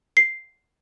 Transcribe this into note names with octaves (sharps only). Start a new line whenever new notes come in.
C7